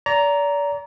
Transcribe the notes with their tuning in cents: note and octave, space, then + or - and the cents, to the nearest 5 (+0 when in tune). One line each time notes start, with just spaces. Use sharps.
D5 -35 A#5 +0